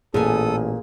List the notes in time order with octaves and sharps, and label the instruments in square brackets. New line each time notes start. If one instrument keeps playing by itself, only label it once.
[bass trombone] A1 [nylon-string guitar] A#2 G#5 [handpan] G#4 [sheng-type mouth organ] A4 D#6